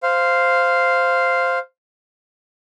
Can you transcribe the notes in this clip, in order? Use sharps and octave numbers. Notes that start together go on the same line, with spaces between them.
C5 F5